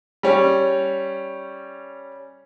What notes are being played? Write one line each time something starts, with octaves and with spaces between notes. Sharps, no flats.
G3 C#4